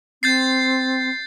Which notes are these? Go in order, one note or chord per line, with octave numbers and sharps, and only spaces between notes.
C4 G6 A6 C7